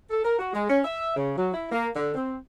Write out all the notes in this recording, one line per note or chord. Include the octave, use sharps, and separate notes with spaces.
A4
A#4
F#4
G#3
C#4
E5
C#3
F#3
E4
A#3
D3
C4